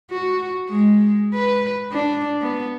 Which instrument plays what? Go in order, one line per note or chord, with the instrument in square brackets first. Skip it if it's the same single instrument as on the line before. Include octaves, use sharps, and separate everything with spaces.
[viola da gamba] F#4
G#3
B4
D4
B3